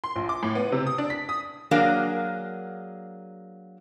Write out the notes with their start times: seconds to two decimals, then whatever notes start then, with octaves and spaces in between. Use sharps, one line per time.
0.04 C6
0.16 A#1
0.29 D6
0.43 A2
0.55 B3
0.72 C3
0.87 D#6
0.98 D4
1.10 B6
1.29 D#6
1.71 F#3 A#3 D4 G#4 A#4 F5